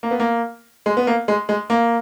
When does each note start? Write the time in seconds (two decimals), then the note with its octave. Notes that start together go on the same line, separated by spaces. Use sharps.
0.03 A#3
0.11 B3
0.20 A#3
0.86 G#3
0.97 B3
1.07 A#3
1.28 G#3
1.49 G#3
1.70 A#3